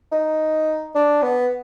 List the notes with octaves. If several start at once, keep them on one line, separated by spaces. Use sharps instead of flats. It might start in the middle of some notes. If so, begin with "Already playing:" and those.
D#4
D4
B3